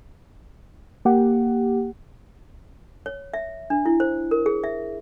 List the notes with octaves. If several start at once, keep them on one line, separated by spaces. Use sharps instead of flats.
A#3 G4 F#5
C#5
E5
D4
E4
C5
A#4
G#4
E5